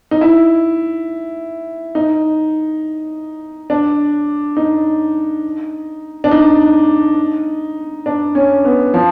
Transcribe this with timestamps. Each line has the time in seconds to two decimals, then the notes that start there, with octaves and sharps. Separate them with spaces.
0.11 D#4
0.21 E4
1.95 D#4
3.70 D4
4.57 D#4
6.24 D4
6.31 D#4
8.06 D4
8.35 C#4
8.65 B3
8.94 F3